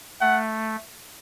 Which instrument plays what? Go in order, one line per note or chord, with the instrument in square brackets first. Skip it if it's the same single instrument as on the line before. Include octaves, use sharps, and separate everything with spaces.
[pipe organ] A3 [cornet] F#5